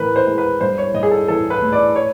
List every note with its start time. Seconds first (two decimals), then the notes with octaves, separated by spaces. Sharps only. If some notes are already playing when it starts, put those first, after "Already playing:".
Already playing: A2 E3 A#4 B4
0.16 C5
0.27 G#3
0.38 B4
0.61 G2 C5
0.78 C#5
0.94 G2 D#5
1.03 G#4
1.11 A4
1.28 E3 A4
1.50 B4
1.62 A3
1.73 D5
1.96 C#5